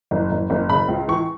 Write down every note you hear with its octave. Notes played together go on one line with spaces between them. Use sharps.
F#1
F#1
F#1
C#3 B5
C#2
E3 C#6